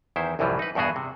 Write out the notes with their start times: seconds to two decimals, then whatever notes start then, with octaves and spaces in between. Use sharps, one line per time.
0.16 E2 D#3 E4 C5
0.39 C2 F#2 A2 E3 F3 G3
0.59 D#4 B4
0.75 E2 G2 B2 B3 F#4 G#4
0.96 C3